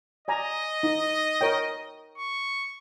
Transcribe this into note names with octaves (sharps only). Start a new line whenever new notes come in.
D5 D#5 G#5 A#5
D#4
A#4 C#5 G5
C#6